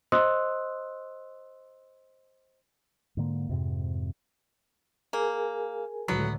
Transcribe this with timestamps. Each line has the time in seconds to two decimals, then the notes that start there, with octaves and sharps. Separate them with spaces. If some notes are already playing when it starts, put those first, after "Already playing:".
0.12 C5 D#5 C6 D#6 E6 F#6
3.17 G#2 D3 A#3
3.49 F2 G#2 C3
5.13 A#3 G#4 A#4 G#5
6.08 C#2 A2 D3 F#3 B3